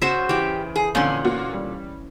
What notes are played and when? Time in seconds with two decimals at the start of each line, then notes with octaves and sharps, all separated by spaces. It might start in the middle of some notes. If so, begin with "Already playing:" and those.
0.02 C#3 F#4 C5 E5
0.29 E3 G4 G5
0.76 G#4
0.95 F2 A#2 D3 C#4 G#5 C6 F#7
1.25 A#3 F4 F#4
1.53 G3